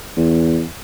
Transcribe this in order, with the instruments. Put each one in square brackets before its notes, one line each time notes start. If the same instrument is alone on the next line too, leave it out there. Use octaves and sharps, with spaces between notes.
[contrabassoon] E2